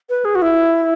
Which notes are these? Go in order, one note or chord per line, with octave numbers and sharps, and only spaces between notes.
B4
G#4
F#4
E4